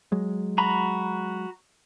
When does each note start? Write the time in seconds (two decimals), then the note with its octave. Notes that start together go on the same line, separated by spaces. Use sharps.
0.12 F#3 G#3
0.58 F#4 A#5 B5